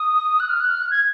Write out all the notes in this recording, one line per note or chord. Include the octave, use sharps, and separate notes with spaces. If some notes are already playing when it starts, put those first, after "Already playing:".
Already playing: D#6
F#6
F6
F#6
F6
F#6
G#6